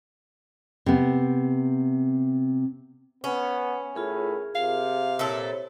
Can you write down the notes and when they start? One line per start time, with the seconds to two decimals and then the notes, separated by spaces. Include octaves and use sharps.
0.86 C3 B3
3.24 B3 C#4
3.95 A2 F4 G#4 A#4
4.55 C3 F5
5.19 A#2 E4 A4 C5 C#5